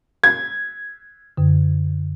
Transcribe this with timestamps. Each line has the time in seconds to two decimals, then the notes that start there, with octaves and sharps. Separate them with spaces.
0.24 G#6
1.37 F#2 D3